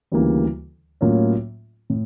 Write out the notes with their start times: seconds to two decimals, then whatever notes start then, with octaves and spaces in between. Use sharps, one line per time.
0.12 D2 C#3 E3 G3 A#3
1.01 A2 F#3 A#3 C#4 F4
1.90 A2